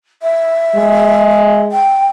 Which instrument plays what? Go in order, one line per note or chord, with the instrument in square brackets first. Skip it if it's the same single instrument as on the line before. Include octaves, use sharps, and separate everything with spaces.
[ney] E5
[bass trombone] G#3
[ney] G5